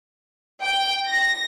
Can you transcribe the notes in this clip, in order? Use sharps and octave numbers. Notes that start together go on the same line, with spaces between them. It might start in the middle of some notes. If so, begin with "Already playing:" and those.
G5
A#6